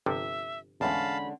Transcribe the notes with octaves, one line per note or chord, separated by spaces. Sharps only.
G1 C3 F3 E5
E2 A2 D3 G#3 C#4 F5 A5 B5